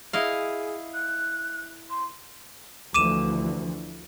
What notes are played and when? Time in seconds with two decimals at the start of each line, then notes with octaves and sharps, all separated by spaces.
0.13 E4 G#4 D#5 F5
0.94 F#6
1.90 C6
2.94 D2 E3 F3 D6 D#7 E7